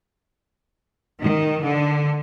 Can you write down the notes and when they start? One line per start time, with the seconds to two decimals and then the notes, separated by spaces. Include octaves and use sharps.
1.20 D#3
1.64 D3